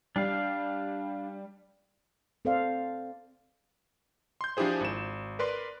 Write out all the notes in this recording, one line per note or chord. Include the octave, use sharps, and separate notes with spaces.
G3 D4 F5
C4 A4 C5 D5 F5
C6 G6
F3 D4 E4 G4 G#4 C5
G#1 E7
A#4 B4 D5 C6